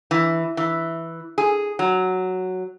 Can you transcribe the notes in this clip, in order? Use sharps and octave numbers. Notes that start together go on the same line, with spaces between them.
E3
E3
G#4
F#3